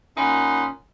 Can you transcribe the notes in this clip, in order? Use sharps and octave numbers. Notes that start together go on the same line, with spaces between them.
A#2 C#4 D#4 F#5 B5 C6